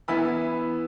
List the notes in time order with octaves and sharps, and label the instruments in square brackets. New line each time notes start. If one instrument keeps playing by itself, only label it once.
[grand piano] E3 B3 E4 B5